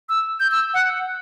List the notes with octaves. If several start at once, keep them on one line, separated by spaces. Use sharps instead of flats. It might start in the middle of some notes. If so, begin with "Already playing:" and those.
E6
G6
E6
F#5